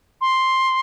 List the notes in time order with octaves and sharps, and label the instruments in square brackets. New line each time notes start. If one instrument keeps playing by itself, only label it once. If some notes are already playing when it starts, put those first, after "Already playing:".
[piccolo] C6